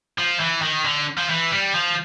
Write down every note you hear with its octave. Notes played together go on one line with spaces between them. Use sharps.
F3
E3
D#3
D3
F3
E3
G3
F3